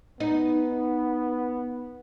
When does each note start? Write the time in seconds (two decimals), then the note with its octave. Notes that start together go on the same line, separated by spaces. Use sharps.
0.20 B3 D#4